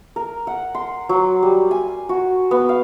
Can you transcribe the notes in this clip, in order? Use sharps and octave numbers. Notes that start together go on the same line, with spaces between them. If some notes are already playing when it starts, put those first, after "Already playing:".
A#4
F#5
C6
F#3
G3
G#5
F#4
B3
F5